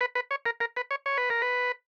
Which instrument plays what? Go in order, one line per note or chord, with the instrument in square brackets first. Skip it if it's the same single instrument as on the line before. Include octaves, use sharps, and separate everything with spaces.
[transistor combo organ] B4
B4
C#5
A#4
A#4
B4
C#5
C#5
B4
A#4
B4